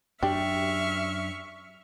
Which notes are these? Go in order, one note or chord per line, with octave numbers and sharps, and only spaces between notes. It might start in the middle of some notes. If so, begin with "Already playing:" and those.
F#2 F#3 D4 G4 E5 C#6 F6